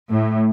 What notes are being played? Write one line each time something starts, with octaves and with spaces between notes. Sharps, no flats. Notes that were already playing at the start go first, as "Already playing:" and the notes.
A2